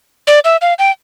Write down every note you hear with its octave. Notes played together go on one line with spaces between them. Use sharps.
D5
E5
F5
G5